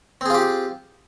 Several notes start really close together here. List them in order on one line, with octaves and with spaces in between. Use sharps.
C4 G#4 F4 G4